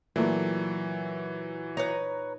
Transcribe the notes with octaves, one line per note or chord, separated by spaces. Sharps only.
A#2 E3 F#3 A3 A#3
D#4 B4 C#5 A#5